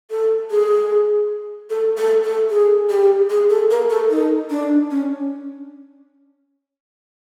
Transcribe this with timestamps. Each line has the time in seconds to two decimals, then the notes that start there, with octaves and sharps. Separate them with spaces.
0.11 A4
0.51 G#4
1.70 A4
1.97 A4
2.24 A4
2.50 G#4
2.90 G4
3.30 G#4
3.50 A4
3.71 A#4
3.90 A4
4.11 D#4
4.50 D4
4.91 C#4